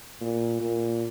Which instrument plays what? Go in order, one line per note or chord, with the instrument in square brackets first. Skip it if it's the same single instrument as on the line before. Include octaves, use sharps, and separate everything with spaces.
[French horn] A#2
A#2